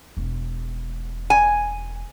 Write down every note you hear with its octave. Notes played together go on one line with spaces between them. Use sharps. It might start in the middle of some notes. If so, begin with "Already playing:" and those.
E1
G#5